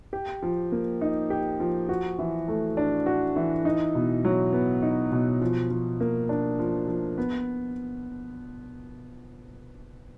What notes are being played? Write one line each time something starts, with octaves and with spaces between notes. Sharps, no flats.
G4
F3
A#3
D#4
G4
F3
F#4
E3
A3
D4
F#4
E3
D#4
B2
F#3
B3
D#4
B2
F3
F3
A#3
D4
F3
F3
B3